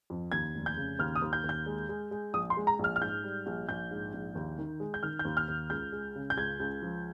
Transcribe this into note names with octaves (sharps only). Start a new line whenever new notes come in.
F2
D#2 G#6
F1
G6
C#3
D#2 F6
D#6
D#2
G6
D#2
G6
G#3
G#3
G#3
A#1 D#6
C6
G#3
A#5
A#1
F6
F6
G#2 G6
G3
A#1
A#1 G6
G#2
A#1
D#2
D#3
G#3
G6
D#3 F6
G6
D#2
F6
D#2
C#2 G6
G#3
C#3
G6
C#2 G#6
C#2
F3